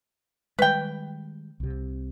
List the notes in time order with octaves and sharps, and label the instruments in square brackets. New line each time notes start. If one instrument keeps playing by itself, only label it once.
[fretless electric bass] D#3 G3 G#3 [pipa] B4 G5
[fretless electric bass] C2 C3